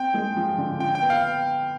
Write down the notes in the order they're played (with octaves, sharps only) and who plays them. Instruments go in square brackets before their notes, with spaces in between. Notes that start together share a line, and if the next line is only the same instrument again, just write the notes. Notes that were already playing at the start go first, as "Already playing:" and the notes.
Already playing: [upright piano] C4 [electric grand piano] G5
[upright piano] G#3
F3
D3
[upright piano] F4 [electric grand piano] G5
[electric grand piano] G5
[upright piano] B3
[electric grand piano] F5